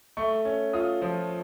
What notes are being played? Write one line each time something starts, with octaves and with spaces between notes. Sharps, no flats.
A3 C#6
C#4
F4 D#6
F3